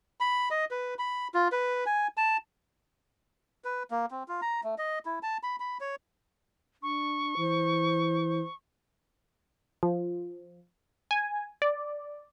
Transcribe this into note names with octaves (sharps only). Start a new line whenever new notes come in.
B5
D#5
B4
B5
F4
B4
G#5
A5
B4
A#3
C4
F4
A#5
A3
D#5
E4
A5
B5
B5
C#5
D4 C#6
E3 C5
F3
G#5
D5